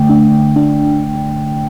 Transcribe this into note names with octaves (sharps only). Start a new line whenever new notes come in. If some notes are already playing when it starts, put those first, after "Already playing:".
Already playing: D3 A3 G5
D4
D4